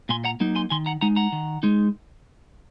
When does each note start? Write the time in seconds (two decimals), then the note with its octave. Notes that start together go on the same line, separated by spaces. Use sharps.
0.09 A#2 G#5 C6
0.25 F#5 A#5
0.40 F#3 A#3 D#4
0.55 G#5 C6
0.70 D#3 G#5 C6
0.86 F#5 A#5
1.01 G#3 D#4 F#5 A#5
1.16 F#5 A#5
1.32 D#3
1.63 G#3 D#4